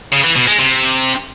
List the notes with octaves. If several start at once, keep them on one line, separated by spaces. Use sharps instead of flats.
C#3
E3
B2
G#3
C3